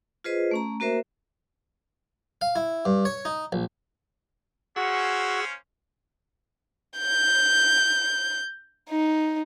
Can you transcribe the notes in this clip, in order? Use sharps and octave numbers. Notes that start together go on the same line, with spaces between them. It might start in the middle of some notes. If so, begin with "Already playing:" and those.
F4 G#4 B4 C5 D#5
A3 C#4 A#5
A#3 F#4 A#4 C5 E5
F5
E4
G2
C#5
D#4
A#1
A#3 C#4 F#4 G#4 C5 F#5 E6
G6
D#4